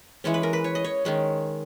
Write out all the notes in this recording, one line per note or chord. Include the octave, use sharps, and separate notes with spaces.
E3 G#3 C#4 C#5
B4
A#4
B4
C#5
D#5
C#5
D#3 G#3 C#4